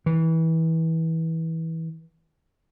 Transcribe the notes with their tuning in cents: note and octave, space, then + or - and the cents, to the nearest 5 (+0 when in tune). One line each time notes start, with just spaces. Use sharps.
E3 -25